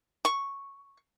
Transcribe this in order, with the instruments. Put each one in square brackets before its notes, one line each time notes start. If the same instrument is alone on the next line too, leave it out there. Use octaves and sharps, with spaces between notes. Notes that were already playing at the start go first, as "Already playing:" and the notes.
[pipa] C#6